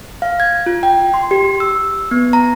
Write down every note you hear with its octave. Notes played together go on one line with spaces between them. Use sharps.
F5
G#6
F4
G5
C6
G4
E6
B3
A#5